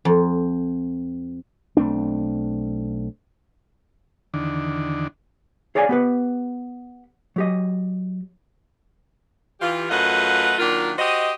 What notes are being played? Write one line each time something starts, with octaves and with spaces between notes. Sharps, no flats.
F2
B1 A3 C4 D4
E2 D3 D#3 D4
G#4 C#5 D5 F5 G5 G#5
B3 G4 B4
F#3 G4 D#5
E3 F4 G4
F#2 A3 F4 B4 D#5 F#5
D#3 F#3 A#3 D4 F4
F#4 G4 C5 D#5